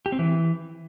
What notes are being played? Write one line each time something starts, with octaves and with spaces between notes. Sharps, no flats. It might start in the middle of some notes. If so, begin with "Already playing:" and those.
G4
C4
E3